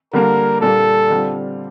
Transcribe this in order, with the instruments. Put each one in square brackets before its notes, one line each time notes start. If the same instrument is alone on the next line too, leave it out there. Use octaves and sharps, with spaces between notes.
[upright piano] D3 G3 A#3 [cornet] A#4
[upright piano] A#2 G3 A#3 D4 [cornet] A4
[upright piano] D3 G3 C4 F4